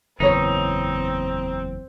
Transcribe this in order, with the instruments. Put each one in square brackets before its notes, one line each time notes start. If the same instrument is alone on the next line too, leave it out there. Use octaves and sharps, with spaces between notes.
[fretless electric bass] F#1 E2 [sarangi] C4 [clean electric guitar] D#4 [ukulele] B4 C#5